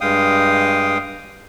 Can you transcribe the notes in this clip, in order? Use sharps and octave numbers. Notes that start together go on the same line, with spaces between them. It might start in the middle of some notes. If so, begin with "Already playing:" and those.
G2 G#3 F5 G5 D#6